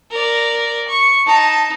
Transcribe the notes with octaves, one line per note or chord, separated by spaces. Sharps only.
A#4 D5
C#6
D#4 A5